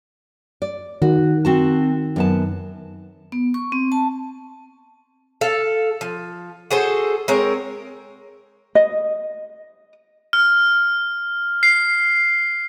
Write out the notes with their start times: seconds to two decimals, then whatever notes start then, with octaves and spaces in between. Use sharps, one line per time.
0.62 D5
1.02 D#3 F#4
1.45 C4 F#4 A5
2.16 F#2 B3 A5
3.32 B3
3.54 C#6
3.72 C4
3.92 A5
5.41 A4 F5
6.01 F3
6.71 F#4 G#4 A4 C5
7.28 G#3 C4 A#4 C#5
8.75 D#5
10.33 F6
11.63 C7